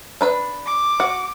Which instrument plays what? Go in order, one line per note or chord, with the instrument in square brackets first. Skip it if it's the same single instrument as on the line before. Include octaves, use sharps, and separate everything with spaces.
[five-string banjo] D4 B4 B5
[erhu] D6
[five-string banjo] F#4 F#5